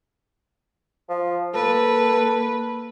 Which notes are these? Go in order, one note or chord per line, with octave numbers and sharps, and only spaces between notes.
F3
A#3 A4 B4